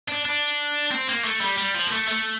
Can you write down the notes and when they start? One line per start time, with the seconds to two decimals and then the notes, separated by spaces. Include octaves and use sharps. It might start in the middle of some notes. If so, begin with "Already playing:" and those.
0.09 D4
0.25 D4
0.91 C4
1.08 A#3
1.25 A3
1.41 G3
1.58 G3
1.74 F3
1.87 A#3
1.91 A3
2.07 A3